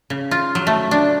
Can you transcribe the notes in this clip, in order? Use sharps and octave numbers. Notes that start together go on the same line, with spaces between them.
C#3
F4
F#3
A3
D4